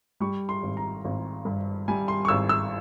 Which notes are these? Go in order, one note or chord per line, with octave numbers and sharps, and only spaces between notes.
G3 C#6
C6
G#1
A#5
G#1
G2
G3 G#5
C6
C#6
G#1 E6
E6